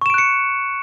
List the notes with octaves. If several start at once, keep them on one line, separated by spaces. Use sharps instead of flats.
C#6 F#6 C#7 D7 E7